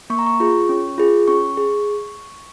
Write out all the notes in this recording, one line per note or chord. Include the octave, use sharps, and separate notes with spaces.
A#3 C#6
A#5
C#6
F4 G#4
C#4
F4 G#4
C#4 C#6
G#4